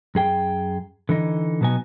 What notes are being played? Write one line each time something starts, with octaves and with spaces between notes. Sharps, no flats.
F#2 G#4 G5
D3 E3 D#4
B2 F#3 B3 D#4 G#5